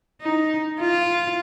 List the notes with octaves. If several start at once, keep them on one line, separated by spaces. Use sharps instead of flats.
D#4
F4